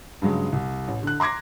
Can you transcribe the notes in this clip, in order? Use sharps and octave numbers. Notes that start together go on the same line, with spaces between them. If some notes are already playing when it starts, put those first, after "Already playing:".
G2 C#3 F#3 G#3
C2
A1
D3 F#6
A#5 C6 D6 G#6 A#6